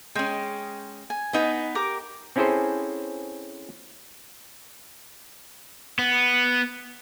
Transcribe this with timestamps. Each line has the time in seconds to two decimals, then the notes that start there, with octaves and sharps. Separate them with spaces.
0.15 G#3 C#4 G5
1.10 G#5
1.33 B3 D#4 B4
1.75 G4 A#4 D6
2.36 C4 C#4 E4 G#4 A4 C5
5.99 B3